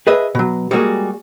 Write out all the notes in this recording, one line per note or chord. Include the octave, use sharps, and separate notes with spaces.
G#4 B4 D#5 E5
B2 F#3
G3 G#3 A#3 B3 F#4 G#4